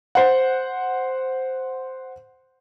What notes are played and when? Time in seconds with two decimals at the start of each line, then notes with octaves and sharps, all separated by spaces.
0.15 C5 F#5